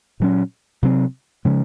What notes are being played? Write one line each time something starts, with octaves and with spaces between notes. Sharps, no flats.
A#2 F#3 C#4
C3 F#3 C4
C#3 F3 G#3 C#4